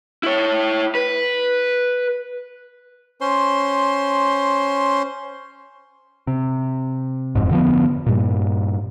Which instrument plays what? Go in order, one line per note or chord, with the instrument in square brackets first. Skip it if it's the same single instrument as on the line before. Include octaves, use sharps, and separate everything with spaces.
[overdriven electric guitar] E4 C#5
B4
[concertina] C#4 C5 C6
[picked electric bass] C3
E1 F2 G#2
D3 F3 B3
G2 A#2